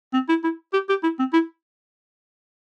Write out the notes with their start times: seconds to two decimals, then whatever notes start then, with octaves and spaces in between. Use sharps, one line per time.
0.13 C4
0.29 E4
0.43 E4
0.73 G4
0.89 G4
1.03 E4
1.19 C4
1.33 E4